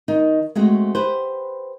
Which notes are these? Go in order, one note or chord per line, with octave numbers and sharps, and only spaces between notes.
D#3 D#4
G#3 A3 C4 F#4
G4 B4 C5